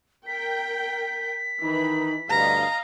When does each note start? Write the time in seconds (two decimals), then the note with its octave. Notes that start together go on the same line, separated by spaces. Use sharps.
0.27 A#4 G5 B6
1.63 D#3 E3 D#4 B5
2.29 D2 G2 D#5 F5 A#5